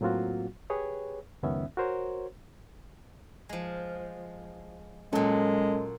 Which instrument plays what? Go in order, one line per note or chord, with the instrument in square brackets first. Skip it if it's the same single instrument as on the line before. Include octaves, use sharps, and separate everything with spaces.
[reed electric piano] A2 F#3 A#3 C4 F4 F#4
G4 G#4 B4 C#5
C#2 F#2 D#3 B3 C#4 E5
F#4 A#4 C5 C#5
[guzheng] F3 G#3
[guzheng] A#2 F#3 [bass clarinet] G#3 [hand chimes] C#4 A4 A5